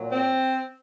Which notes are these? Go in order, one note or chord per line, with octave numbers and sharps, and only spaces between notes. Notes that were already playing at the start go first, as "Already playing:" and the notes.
Already playing: A#2 F#3
C4